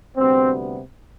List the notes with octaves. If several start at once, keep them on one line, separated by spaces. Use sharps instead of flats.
D2 C3 G3 B3 C4